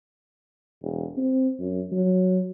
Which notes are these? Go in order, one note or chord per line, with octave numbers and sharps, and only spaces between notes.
E1
C4
F#2
F#3